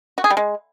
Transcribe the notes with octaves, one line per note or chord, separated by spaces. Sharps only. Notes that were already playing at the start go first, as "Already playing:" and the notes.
F#4
G#4
G3
G#3